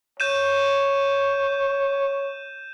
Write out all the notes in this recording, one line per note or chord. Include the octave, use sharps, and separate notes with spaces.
C#5 G6 D#7 E7